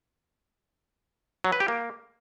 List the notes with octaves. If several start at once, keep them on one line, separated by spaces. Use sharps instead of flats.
F#3
B4
G4
A#3